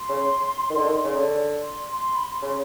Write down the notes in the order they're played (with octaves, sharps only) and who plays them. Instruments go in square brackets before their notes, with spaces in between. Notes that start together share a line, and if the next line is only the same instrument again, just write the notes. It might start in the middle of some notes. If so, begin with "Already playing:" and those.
Already playing: [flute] C6
[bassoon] C#3
D#3
D3
D#3
C#3
D3
[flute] C6
C6
B5
C6
[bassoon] C#3 [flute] C6